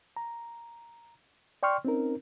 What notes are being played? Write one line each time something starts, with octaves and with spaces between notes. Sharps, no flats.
A#5
D5 G5 C6 C#6 F6
C4 C#4 D#4 A#4